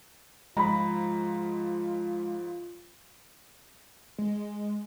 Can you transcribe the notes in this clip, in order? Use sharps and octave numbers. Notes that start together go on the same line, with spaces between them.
G#2 F3 G#3 F4 A#5 B5
G#3